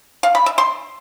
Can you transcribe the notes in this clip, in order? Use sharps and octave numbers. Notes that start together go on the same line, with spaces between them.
F5
B5
E5
C6